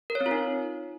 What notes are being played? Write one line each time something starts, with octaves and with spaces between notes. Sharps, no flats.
A#4
C#5
C4
F4
D#4